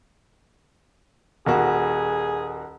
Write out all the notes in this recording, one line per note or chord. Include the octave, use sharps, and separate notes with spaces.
D#1 A#3 F#4 G#4